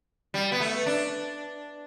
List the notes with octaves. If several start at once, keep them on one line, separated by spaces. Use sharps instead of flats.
G3
B3
A3
D4